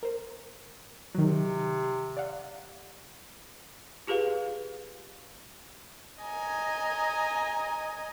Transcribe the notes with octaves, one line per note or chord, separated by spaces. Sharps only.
A#4 C5
C3 D#3 F#3
D5 F5 F#5
F4 G4 G#4 B4 F5
D#5 G#5 A#5